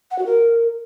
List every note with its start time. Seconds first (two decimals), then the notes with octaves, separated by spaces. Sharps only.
0.11 F#5
0.19 F#4
0.26 A#4